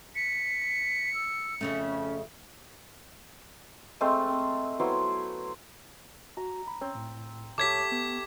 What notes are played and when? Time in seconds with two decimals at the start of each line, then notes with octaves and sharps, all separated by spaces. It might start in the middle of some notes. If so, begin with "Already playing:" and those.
0.15 B6 C#7
1.14 E6
1.61 F2 C#3 A3 C#4
4.01 G#3 A3 C4 F5
4.28 C4
4.79 F#3 B3 E4 C5
6.37 F#4 A#5
6.68 B5
6.81 C4 C#4 C#5
6.95 A2
7.58 C#2 A3 G4 C#5 D6 G#6 B6
7.92 B3